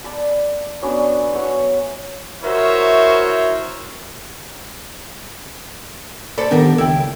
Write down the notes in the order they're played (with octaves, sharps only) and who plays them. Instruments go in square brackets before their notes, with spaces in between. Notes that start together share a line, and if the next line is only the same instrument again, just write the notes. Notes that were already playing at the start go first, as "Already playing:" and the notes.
[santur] D5 A5 B5
F#3 B3 C#4 D4
F#4 C#5 E5 F#5
[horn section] E4 F#4 A#4 C5 C#5 E5
[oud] A4 [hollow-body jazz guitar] C5 D5 B5
[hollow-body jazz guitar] D#3 B3 D4 [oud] G4 A#4
[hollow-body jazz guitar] C#2 G5 [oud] E4